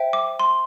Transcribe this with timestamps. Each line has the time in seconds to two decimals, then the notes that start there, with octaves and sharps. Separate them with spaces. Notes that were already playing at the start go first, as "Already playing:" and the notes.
Already playing: C5 E5 G5
0.13 D6
0.39 C6